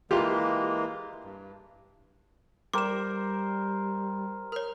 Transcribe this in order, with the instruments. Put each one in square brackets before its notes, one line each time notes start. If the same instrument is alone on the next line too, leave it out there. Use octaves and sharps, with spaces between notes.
[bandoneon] E3 G#3 A#3 [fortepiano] F4 G4
[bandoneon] G2
[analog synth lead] G3 [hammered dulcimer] A#4 C5 [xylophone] D6 E7
[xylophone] A#4 C#5 [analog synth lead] F6